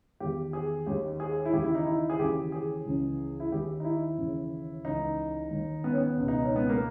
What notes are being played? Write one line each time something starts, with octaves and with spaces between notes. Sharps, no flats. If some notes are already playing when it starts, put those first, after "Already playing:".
E2 D#3 G4
G#4
D#2 D#3 G4
G#4
E4
D#2 C#3 E3 G4
E4
D#4
E4
G#4
D#2 C#3 E3 G4
G#4
C#2 C#3 E3
E4
D#2 D#3 G4
D#4
E4
D#2 C#3 E3
C#2 C#3 E3 D#4
D#2 D#3
B3
C#4
B3
C#2 B2
D#4
C#4
B3
A#3